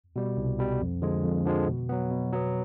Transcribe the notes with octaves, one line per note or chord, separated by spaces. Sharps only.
B2 G3
C2
B2 G3
F2
D3 F3 G#3
F2
D3 F3 G#3
B2
F#3 B3
B2
F#3 B3